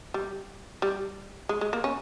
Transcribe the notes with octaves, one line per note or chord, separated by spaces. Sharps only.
G3
G3
G#3
G#3
A#3
C#4